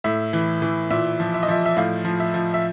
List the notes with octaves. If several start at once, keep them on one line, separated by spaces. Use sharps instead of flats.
A2 E5
E3
E3
A#2 E5
F3
E5
D#5
F3 E5
E5
A2 F5
F3
E5
F3
E5